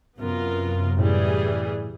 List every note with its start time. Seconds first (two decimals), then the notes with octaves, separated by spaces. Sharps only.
0.18 F#2 C3 B3 F4 A#4
0.99 A2 E3 G3 G#4